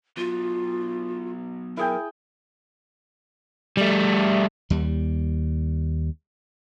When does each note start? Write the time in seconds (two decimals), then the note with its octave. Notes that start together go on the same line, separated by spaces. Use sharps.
0.17 F#3 B3 F4
1.77 E4 G#4 A#4 G5
3.77 G3 A3
4.70 D#2 G3